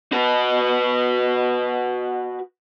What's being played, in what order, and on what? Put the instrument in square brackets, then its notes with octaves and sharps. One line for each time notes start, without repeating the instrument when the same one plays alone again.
[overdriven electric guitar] F#4 B4